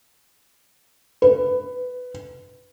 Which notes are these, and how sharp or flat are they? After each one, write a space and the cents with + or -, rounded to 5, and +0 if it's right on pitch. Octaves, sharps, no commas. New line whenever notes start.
B4 +15